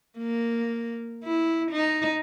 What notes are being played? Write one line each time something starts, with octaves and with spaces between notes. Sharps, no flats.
A#3
E4
D#4